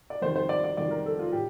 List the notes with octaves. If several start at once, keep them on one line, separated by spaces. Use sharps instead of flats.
D5
F2 D#3 G3 C5
C5
D5
D5
F2 D#3 G3 D5
A#4
A4
F4
A2 G4